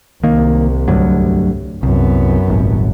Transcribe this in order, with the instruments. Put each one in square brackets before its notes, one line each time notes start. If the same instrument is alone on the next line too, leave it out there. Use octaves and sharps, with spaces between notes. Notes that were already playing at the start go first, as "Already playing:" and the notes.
[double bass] C2 [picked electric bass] D#3 A#3
[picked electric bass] D2 G2 F#3
[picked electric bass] C2 [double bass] F#2 B3
[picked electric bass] D#1 G#1